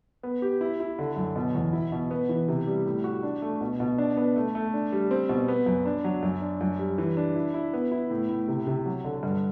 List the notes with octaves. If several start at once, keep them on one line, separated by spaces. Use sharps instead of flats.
B3
G4
E4
E4
D3
F#2
B2
E2
E4
B2
B3
E3
C3
G3
A2
F#4
D4
A3
B2
B2
D4
B3
A3
A3
D4
G3
C4
B2
B3
F#2
D4
F#3
F#2
D4
F#2
G3
E3
D4
E4
E4
B3
E4
A2
A2
C3
C3
F#3
D3
G2